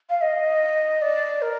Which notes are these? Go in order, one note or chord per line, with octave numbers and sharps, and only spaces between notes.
F5
D#5
D5
A#4